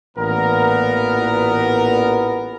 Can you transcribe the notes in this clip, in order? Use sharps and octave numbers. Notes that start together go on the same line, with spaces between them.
A1 A#2 B3 A#4